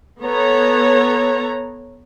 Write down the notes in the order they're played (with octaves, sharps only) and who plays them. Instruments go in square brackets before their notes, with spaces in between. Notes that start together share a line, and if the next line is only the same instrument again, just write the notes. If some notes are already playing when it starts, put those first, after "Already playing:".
[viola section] B3 A4 C#5 A#5